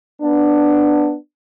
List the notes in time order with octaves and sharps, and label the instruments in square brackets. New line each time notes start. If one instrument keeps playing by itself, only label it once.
[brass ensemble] B3 D4